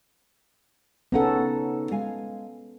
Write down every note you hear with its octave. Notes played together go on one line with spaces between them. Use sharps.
C#3 B3 C#4 D#4 A4 F#5
G#3 F5 G#5